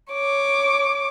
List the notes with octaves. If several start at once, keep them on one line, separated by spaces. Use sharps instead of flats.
C#5 D6